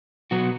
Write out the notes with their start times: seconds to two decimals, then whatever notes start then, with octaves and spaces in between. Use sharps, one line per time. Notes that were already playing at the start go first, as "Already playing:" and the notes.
0.31 B2 F#3 B3 F#4